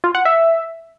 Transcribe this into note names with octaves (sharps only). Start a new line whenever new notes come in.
F4
F#5
E5